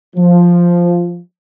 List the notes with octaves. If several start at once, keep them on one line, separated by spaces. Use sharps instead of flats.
F3